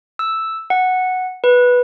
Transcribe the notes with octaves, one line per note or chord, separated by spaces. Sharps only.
E6
F#5
B4